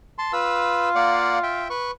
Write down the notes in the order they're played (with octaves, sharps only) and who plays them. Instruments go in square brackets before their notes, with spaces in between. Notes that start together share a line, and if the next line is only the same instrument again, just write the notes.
[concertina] A5 C6
[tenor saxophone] F4 [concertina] B4 E6
[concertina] A#3 D5 F#5
E5 G5
B4 C#6